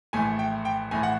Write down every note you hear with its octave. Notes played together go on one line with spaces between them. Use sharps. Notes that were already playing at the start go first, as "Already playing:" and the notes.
A#1 A2 E3 A3 G#5
G5
G5
A#1 A2 E3 A3 G#5
F#5